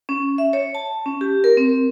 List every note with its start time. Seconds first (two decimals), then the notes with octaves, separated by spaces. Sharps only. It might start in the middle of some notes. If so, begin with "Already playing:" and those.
0.09 C#4
0.38 E5
0.53 C#5
0.75 A5
1.06 C#4
1.21 G4
1.44 A#4
1.57 C4